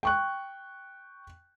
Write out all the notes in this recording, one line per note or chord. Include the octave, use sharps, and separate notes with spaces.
G5 C#6 F#6